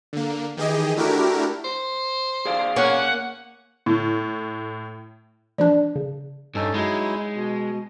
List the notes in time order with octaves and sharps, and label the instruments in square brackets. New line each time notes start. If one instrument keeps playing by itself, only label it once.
[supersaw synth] D3 A#3
D#3 E3 G4 G#4 D#5
A3 D4 E4 F#4 G4 A#4
[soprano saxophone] C5
[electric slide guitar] G#4 D5 F5
[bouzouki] A#3 C#5 [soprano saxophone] C#4 [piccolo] F#5
[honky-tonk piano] A2
[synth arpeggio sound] E3 F3 D4 [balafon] D5
[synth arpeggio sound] C#3
[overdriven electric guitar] G2 [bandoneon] C#4 D#4 A4
[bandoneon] F#3 D#4 E4 [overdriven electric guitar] G#3
[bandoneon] B2